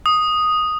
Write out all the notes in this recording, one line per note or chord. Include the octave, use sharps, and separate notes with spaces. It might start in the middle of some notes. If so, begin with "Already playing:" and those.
D#6